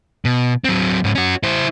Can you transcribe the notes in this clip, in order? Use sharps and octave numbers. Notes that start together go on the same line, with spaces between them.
B2
F#3 C4
G#2 C#4
C#4 F#4
E4 C5